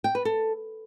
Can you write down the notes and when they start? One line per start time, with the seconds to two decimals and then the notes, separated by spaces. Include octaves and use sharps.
0.04 G5
0.15 B4
0.25 A4